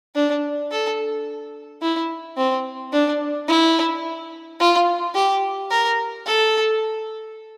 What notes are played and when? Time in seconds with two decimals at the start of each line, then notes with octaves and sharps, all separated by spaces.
0.15 D4
0.71 A4
1.82 E4
2.37 C4
2.92 D4
3.48 E4
4.60 F4
5.15 G4
5.71 A#4
6.26 A4